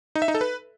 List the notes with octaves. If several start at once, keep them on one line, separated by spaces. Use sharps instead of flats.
D#4
E5
D#4
A4
B4